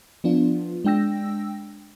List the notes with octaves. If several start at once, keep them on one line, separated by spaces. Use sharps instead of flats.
F3 B3 D4 F4
G#3 D4 G5 E6 A#6